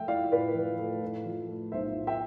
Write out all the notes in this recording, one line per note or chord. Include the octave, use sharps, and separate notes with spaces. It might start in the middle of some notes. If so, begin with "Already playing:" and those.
Already playing: F3 A3 E5 G5
E4 D5 F5
A2 B4 D5
F3
A3
A2
F3
A3
B1 C5 E5
A2
E5 G5